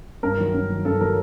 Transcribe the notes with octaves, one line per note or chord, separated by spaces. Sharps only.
G2 A#4
D#3 F#3
G2
D#3 F#3
G2 A4
D#3 F#3 A#4